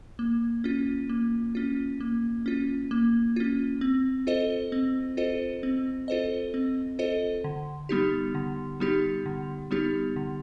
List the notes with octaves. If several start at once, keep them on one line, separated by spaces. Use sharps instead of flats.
A#3
C#4 F4
A#3
C#4 F4
A#3
C#4 F4
A#3
C#4 F4
C4
F4 A4 C5 D#5
C4
F4 A4 C5 D#5
C4
F4 A4 C5 D#5
C4
F4 A4 C5 D#5
D3
G3 B3 D#4 G4
D3
G3 B3 D#4 G4
D3
G3 B3 D#4 G4
D3